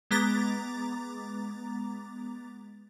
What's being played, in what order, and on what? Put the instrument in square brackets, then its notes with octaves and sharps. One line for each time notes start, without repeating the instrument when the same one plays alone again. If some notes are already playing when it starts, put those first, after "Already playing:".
[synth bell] G#3 B3 A#5 D6 A6